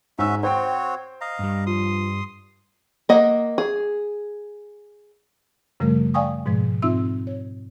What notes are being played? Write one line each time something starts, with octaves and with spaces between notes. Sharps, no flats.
G#2 C#4 F#4 E5 E6
C4 F#4 C5 C#5 G5
D#5 F5 A#5
G2 G3
F3 C6 D#6
A#3 D#5 F#5
G#4
F#2 C#3 F3 G3 A3 A#4
D5 F5 G5 G#5 C#6 D#6
G#2 B2 F3 G#3
G#2 C4 D#4 F4 E5 E6
C#5